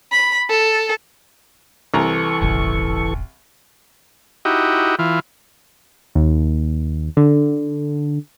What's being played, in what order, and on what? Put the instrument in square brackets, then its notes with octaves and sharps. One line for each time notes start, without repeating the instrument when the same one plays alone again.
[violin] B5
A4
[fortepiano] C2 A#5 [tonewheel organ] E3 A4 C#6
[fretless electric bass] D#1 G#1 C#3
[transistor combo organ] D#4 E4 F#4 G4
E3 F4
[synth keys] D#2
D3